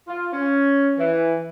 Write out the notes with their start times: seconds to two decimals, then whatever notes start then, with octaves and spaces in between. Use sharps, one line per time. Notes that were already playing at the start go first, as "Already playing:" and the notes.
0.08 F4
0.32 C#4
0.98 E3